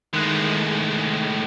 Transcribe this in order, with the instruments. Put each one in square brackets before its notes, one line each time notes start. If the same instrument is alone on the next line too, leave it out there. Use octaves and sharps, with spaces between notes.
[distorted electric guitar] A2 G#3 [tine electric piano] D#3 F#6